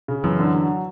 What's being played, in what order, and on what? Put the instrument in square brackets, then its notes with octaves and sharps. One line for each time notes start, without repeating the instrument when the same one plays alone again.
[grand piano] C#3
[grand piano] F#2 [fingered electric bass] E3
[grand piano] D3
F#3